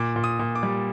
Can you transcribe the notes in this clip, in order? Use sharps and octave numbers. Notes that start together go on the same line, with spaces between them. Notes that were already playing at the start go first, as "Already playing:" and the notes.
Already playing: A#2 D6
A#2
D#6
A#2
D6
G3